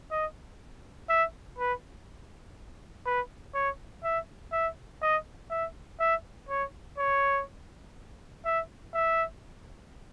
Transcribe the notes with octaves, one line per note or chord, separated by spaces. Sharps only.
D#5
E5
B4
B4
C#5
E5
E5
D#5
E5
E5
C#5
C#5
E5
E5